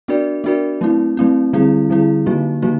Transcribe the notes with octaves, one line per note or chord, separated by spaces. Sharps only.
B3 D4 F#4 A#4 D5
B3 D4 F#4 A#4 D5
F#3 A3 C4 E4
F#3 A3 C4 E4
D3 G3 C4 E4 G#4
D3 G3 C4 E4 G#4
D3 F#3 A#3 D#4 F#4
D3 F#3 A#3 D#4 F#4